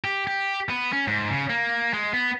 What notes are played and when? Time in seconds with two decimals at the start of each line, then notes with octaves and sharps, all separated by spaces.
0.04 G4
0.27 G4
0.69 B3
0.93 C#4
1.07 G#2
1.31 C#3
1.50 A#3
1.94 G#3
2.13 B3